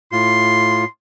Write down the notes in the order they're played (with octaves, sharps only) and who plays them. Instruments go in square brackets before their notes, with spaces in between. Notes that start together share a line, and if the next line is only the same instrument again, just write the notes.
[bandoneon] A2 F4 [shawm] C6